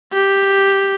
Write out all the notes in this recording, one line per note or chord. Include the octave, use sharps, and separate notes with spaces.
G4